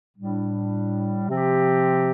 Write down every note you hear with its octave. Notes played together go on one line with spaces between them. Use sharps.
A2 G3 D4
C3 F3 C4 G4